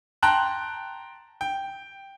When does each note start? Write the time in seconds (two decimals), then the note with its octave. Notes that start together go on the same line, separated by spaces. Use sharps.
0.23 G5 A5 A#5 C6 F#6
1.41 G5